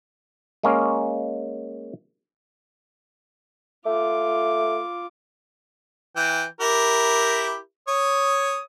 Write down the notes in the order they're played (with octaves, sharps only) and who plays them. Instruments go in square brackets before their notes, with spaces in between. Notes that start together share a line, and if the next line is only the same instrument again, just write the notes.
[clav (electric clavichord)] G#3 A#3 C#4
[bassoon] A3 [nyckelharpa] F4 D6
[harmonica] E3 G5
E4 G4 A#4
C#5 D#6